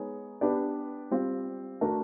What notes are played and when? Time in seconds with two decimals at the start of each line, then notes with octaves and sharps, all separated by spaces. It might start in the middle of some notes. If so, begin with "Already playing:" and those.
Already playing: G#3 B3 D#4 G#4 C#5
0.41 B3 D4 G4 B4 D5
1.11 G3 C4 F4
1.81 A3 D4 F#4 A#4